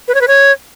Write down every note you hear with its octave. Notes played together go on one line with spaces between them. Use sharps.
B4
C#5
B4
C#5